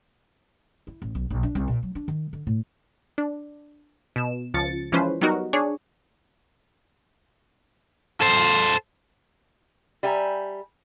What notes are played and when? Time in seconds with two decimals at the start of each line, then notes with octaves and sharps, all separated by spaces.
0.87 E4
1.02 A1
1.15 B1
1.30 A#1
1.43 D4
1.55 C2
1.68 A#2
1.83 F#3
1.95 D4
2.08 D#3
2.33 D3
2.47 A2
3.18 D4
4.16 B2 E7
4.54 C#2 F3 A6 C#7
4.92 E3 F3 G#3 C#4 B4 C5
5.21 F#3 G3 B3 D#4 F#4 A#4
5.53 D4 G#4 C#5
8.22 A4 C5
10.03 G3 E5 G#5 A#5